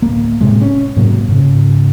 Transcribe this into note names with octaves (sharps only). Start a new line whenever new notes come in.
D1 A#3
A2 C3 G#3
C#4
G#2 C3 F#3 A#3
G#2 C#3